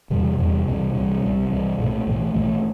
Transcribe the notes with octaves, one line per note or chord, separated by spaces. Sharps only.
E2 C3 E3 G3
E2 C3 E3 G3
C2 C3 E3 G3
C2 C3 E3 G3
C2 C3 E3 G3
C2 C3 E3 G3
B1 A2 E3 A3
B1 A2 E3 A3
B1 A2 E3 A3